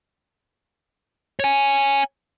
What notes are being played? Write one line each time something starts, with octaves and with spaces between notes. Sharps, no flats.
C#5 G#5